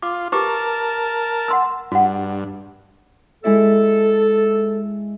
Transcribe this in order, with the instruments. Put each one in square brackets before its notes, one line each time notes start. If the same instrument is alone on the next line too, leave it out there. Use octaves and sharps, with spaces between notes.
[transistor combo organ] F4 [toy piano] D6
[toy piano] G4 B4 D6 [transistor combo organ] A#4 A5
[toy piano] F#5 C6 E6
[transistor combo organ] G2 [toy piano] F#4 F#5
[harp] G#3 E4 E5 [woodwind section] A4